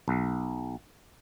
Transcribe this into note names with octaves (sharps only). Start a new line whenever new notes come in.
B1